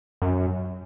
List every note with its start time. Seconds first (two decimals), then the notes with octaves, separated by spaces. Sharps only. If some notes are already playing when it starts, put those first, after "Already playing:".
0.22 F#2